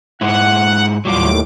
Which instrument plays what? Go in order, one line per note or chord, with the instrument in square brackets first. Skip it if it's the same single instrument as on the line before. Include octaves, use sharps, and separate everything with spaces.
[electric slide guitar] G#2 G#3 E4 [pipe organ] F#5
[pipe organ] D#2 A2 D6 [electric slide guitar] F#3 G3 F4